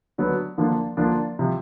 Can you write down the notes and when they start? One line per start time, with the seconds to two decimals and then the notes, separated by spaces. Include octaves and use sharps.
0.18 D3 F#3 B3
0.58 D3 F3 A#3 D4 F4
0.97 D3 F3 A#3 D4 F4
1.39 C3 F3